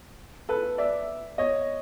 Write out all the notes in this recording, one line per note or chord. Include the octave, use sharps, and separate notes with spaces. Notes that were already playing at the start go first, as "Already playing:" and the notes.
A4 B4
D5 E5
C#5 D#5